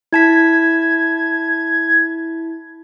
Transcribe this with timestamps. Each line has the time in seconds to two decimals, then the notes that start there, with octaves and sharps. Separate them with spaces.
0.12 E4 A5 G#6 B6